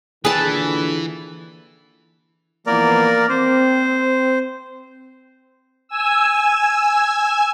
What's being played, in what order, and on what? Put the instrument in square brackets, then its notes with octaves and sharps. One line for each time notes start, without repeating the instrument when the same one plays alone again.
[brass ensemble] D#2 A#2 D3 [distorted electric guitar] E3 [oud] G#4 [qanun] B4 A5
[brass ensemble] E3 F3 B3 [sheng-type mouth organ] A#3 A#4 D5
[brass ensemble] C4 [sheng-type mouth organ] C5
[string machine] G#5 E6